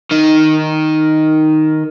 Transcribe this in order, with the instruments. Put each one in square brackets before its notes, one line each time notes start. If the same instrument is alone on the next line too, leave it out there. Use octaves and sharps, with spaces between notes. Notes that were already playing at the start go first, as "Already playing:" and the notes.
[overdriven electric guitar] D#3 D#4